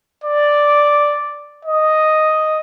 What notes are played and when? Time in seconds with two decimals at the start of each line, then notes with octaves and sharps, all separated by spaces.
0.24 D5
1.65 D#5